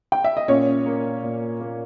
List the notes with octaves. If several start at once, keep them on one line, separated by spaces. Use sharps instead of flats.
G5
E5
D#5
A#2 C#4 C#5
A#3
A#2
A#3